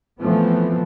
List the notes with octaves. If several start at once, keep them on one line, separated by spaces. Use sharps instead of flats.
E3 F3 A3 B3 C4